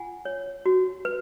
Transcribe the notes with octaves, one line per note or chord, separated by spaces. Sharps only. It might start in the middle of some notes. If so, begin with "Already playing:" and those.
Already playing: F4 F#5 G#5
C#5
F#4
B4